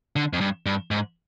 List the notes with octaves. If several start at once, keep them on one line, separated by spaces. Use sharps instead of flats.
D3
F2
G2
G2
G#2